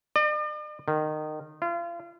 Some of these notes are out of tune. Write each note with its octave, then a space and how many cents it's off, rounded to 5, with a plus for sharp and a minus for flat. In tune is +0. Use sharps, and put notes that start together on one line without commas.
D5 +45
D#3 -20
F4 -35